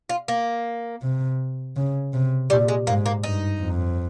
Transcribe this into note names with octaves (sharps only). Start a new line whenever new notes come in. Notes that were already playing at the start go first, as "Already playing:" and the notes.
F4
A#3
C3
C#3
C3
A#2 G3
G#3
G#2 A#3
A#3
G2 D#4
F2